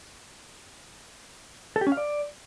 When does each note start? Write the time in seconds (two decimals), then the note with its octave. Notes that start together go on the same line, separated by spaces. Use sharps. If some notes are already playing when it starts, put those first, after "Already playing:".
1.76 A4
1.81 G4
1.87 C#4
1.92 F5
1.97 D5